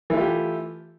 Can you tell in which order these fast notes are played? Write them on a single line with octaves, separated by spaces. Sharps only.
E3 A3 F4 G4